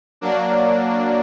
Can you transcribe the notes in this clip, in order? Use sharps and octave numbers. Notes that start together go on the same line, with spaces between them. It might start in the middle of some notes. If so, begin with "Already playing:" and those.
F#3 A#3 D4